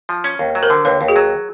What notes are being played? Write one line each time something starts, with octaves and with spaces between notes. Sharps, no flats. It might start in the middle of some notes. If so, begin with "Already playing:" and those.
F3
C#4
D#2
F#3
A#4 C5
D3
D#2 B4 C#5
D#2
F#4 G#4
F#3